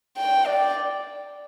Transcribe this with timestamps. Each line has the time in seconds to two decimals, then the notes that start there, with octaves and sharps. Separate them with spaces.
0.17 G5
0.46 D5